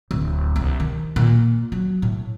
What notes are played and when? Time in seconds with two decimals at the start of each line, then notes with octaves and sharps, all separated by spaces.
0.11 D1
0.56 C2
0.80 D#3
1.16 A#2
1.72 F#3
2.02 A2